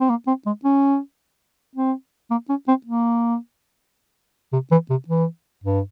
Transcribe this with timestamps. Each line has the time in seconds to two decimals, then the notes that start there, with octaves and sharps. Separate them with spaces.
0.01 C4
0.10 A#3
0.27 C4
0.46 G#3
0.65 C#4
1.76 C4
2.31 A#3
2.50 C#4
2.68 C4
2.86 A#3
4.53 C3
4.72 E3
4.90 C3
5.08 E3
5.64 G2